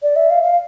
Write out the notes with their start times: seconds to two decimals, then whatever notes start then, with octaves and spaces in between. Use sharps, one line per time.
0.03 D5
0.16 E5
0.30 F5
0.43 F5